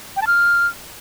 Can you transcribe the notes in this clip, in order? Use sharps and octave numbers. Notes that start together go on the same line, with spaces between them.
G5
A5
F6